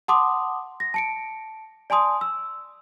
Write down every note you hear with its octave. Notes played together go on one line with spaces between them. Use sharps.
F#5 A5 C6 D6 D#6
A#6
A5 C#7 D7
D5 G#5 A5 C6 D#6
E6